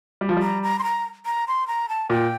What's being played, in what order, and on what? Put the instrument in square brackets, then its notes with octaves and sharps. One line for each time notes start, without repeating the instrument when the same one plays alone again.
[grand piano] G3
F3
G3
[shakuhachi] A#5
A#5
C6
A#5
A#5
C6
A#5
A5
[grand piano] A#2 [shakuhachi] G5